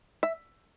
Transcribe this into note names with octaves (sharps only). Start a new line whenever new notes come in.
E5